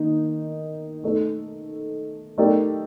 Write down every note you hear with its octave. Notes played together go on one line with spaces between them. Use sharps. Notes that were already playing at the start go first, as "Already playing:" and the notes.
Already playing: D#3 A#3 D#4
A3 D#4 A4
A3 D#4 G4 A#4 D5